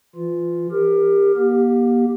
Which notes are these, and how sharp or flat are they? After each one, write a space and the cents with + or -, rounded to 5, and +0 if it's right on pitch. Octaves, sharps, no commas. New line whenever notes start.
E3 +30 F4 +0
G4 +25 A#4 +0
A#3 +45 G4 +0